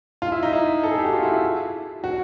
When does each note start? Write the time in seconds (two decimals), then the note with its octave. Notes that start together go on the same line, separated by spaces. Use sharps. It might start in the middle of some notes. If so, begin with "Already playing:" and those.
0.22 F4
0.32 E4
0.43 D#4
0.53 E4
0.83 A4
0.91 G#4
0.98 G4
1.05 F#4
1.13 F4
1.23 E4
1.33 E4
2.04 F#4